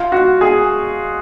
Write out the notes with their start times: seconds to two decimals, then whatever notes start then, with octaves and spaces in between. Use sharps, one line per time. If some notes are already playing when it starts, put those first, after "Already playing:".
Already playing: F4
0.12 F#4
0.41 G#4